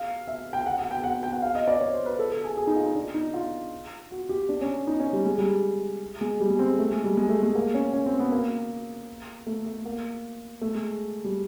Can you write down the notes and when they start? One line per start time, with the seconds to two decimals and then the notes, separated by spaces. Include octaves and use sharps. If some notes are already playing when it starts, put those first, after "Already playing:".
Already playing: F5
0.27 E5
0.53 G5
0.66 F#5
0.78 F#5
0.91 G5
1.04 F#5
1.23 G5
1.32 F#5
1.42 F5
1.55 D#5
1.68 D5
1.81 C#5
1.93 C5
2.06 B4
2.19 A4
2.32 A4
2.44 G#4
2.57 G#4
2.67 D#4
2.76 F4
2.86 D#4
2.95 D4
3.14 D#4
3.34 F4
4.11 F#4
4.29 G4
4.49 D4
4.61 C#4
4.87 D#4
5.00 C#4
5.13 G3
5.25 G#3
5.38 G3
6.21 G#3
6.40 G3
6.50 G#3
6.59 C4
6.79 A3
6.92 G#3
7.04 G3
7.17 G#3
7.29 A3
7.42 G#3
7.55 A#3
7.74 C#4
7.94 C#4
8.06 C4
8.19 B3
8.32 A#3
9.47 A3
9.66 A3
9.85 A#3
10.61 A3
10.74 G#3
11.24 G3